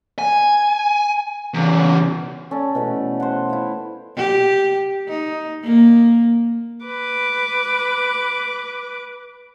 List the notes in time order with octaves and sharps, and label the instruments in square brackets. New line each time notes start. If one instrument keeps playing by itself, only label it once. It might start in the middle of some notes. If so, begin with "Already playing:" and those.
[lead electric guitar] G#5
E2 C#3
[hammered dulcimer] C#4 A4 D5
B2 E3 A3
C5 F#5
E4 F5
[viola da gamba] G4
D#4
A#3
[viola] B4 D6